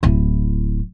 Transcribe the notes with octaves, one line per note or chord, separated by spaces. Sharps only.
D1 E4